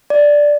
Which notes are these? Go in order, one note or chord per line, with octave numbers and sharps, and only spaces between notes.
D5